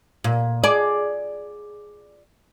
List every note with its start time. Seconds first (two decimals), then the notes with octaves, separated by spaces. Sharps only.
0.24 A#2
0.64 G#4 D5